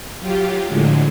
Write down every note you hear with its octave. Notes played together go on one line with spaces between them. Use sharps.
F#3 F4 G4
A2 D3 F3 F#3 G#3